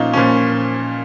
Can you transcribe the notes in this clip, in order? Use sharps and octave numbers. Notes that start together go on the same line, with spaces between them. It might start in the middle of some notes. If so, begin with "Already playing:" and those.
Already playing: A#2 F3 C#4 D#4 F4
A#2 F3 C#4